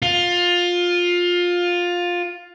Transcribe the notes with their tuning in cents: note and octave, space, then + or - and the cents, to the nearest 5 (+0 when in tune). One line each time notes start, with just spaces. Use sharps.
F4 +15